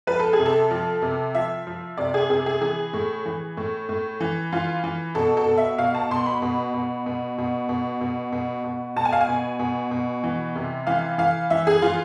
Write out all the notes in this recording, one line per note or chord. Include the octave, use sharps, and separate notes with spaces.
F3 B4
A4
G#4
C3
A4
F3
C3
F3 E5
F3
C3 D5
G#4
C3 G#4
G#4
E3 G#4
A2
E3
A2
A2
E3
E3 F4
E3
B2 A4
A4
B2
E5
B2 F5
A5
B2 C6
B5
B2
B2
B2
B2
B2
B2
B2
B2
B2 A5
G#5
F5
G#5
B2
B2
B2
E3
C3
E3 F5
E3 F5
E3 E5
G#4
E3 F4